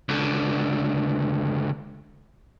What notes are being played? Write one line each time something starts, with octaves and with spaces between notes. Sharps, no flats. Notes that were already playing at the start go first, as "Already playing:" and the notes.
C#2 D3